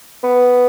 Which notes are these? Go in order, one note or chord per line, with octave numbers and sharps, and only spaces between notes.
B3